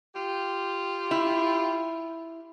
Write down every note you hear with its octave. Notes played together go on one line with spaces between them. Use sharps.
F4 G4
E4